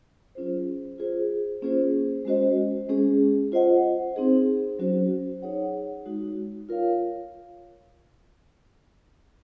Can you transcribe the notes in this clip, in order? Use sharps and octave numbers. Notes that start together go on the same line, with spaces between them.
F#3 C#4 F4 G#4 C5
F4 G#4 C5
A#3 C#4 F4 G#4 C5
G#3 C#4 F#4 C5 D#5
G#3 C#4 G#4
F4 C5 D#5 F#5
C4 D#4 G#4 C5
F#3 C#4 F#4 C5
D#4 G#4 C#5 F#5
G#3 D#4 F#4
F4 A#4 C#5 F5